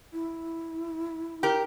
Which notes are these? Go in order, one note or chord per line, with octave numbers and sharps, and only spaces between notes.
E4
G4 A#4